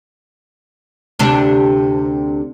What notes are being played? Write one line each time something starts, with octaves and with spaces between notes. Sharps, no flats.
D2 C3 D4